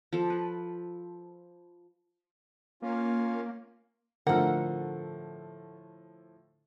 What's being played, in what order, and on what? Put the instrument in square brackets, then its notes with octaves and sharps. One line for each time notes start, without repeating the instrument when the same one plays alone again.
[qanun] F3 A4
B4
[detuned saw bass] A#3 [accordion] C#4 F4
[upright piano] A2 F3 A3 [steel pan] D3 A#4 [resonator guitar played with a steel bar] A4 F#5